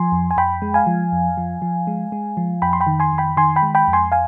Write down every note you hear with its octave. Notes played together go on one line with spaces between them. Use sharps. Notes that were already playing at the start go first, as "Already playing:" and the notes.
Already playing: F3 G#5 C6
F2
G#5
F2 G5 B5
G#3
F5 G#5
F3
F2
F3
F3
G#3
G#3
F3
F2 G5 B5
C6
G5 B5
D#3
G#5 C6
F2
G5 B5
D#3 G#5 C6
G5 B5
G#3
G5 B5
F2
G#5 C6
F5 G#5